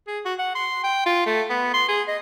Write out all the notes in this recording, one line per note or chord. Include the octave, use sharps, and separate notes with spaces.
G#4
F#4
F#5
C6
G5
F4
A3
B3
C6
G#4
D#5